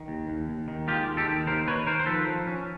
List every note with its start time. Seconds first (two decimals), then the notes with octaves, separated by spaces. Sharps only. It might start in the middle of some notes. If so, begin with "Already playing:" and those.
Already playing: D#3
0.08 D#2
0.29 D#2
0.49 D#2
0.68 D#3
0.87 G#3 F4 G4
1.08 D#2
1.17 G4 A4
1.28 D#3
1.47 D#2 A#4 C5
1.67 D#2 B4 C#5
1.86 D#3 A#4 C5
2.00 C5
2.06 F3 A4 B4
2.26 F3
2.47 C#4